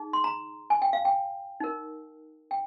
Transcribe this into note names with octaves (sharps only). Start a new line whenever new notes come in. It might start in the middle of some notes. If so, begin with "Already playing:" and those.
Already playing: D#4 G#4
C6
A#5
G#5
G5
F5
G5
D#4 A#4
G5